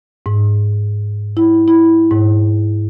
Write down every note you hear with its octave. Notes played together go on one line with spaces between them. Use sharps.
G#2
E4
E4
G#2